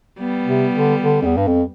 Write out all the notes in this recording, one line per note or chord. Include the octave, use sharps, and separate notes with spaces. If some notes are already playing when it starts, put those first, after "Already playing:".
G3 B3
C3
D3
D3
F2
E2
G2
F2